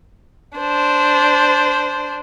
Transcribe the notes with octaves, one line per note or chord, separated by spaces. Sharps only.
D4 C5